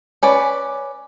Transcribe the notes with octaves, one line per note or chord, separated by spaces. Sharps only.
C#4 B4 D5